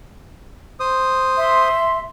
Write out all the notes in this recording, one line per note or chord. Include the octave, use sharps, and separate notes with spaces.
C5 D#6
E5 C6